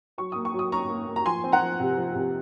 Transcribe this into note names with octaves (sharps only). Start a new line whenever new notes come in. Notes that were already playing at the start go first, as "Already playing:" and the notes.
F#3 C#6
A#3 D#6
C#6
F#3 D#6
C#4 A#5 C#6
A#3
A#3
A#5
F3 G#5 C6
C4
F#5 A#5
F3
C3
F3
C3